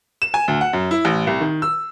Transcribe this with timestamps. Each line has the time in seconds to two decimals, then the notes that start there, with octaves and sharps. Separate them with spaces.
0.22 E7
0.34 G#5
0.48 D2
0.61 F#5
0.73 F#2
0.91 E4
1.05 A1
1.27 C2
1.41 D#3
1.62 E6